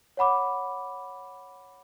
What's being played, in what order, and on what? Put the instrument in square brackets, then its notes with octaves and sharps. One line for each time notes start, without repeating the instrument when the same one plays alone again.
[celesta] C#5 F#5 B5 D6